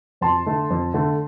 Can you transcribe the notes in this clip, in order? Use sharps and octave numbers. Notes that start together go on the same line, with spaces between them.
F2 A5 C6
D3 A3
F2
D3 A3